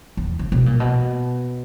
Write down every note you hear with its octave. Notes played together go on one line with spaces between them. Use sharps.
E2
C#3
B2
A#2
B2